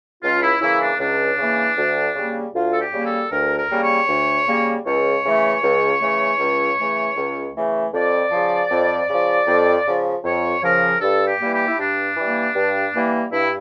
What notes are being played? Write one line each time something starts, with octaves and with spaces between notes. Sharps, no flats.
C#2 F4
E4
C#3 E3 A#3 E4
D4
C#2 D4
C#3 E3 A#3
D2
C#3 G3 A#3
D2 F4
A4
G4
C#3 G3 A#3
A4
D2 A#4
A#4
C#3 G3 A#3
C#5
D2
C#3 G3 A#3
C#2 C#5
C#3 E3 A3
C#2
C#3 E3 A3
C#2
C#3 E3 A3
C#2
C#3 E3 A3
F2 D5
C#3 F3
F2
C#3 F3
F2
C#3 F3
F2 C#5
C#3 F3 A#4
G2 A4
G4
E3 G3 A#3
G4
E4
G2 D4
E3 G3 A#3
G2
E3 G3 A#3
G2 E4